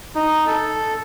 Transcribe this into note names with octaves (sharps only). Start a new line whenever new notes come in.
D#4
A4